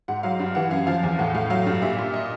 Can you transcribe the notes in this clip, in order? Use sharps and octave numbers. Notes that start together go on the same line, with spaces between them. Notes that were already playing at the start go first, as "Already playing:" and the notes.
G#2 F#5
F#3 F5
G2
E3 F#5
F#2 F5
F3 F5
E2
A2 F#5
A2 F5
F#3 F5
G2
A#2 E5
A#2
D#5